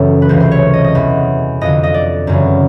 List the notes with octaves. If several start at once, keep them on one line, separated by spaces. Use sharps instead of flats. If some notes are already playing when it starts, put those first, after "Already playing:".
Already playing: F#2 C#3 E3 A4
B4
C#2 C3 E3 C5
C5
C#5
D#5
D#5
E2 B2
F2 D3 D#5
D#5
D5
F#2 C#3 E3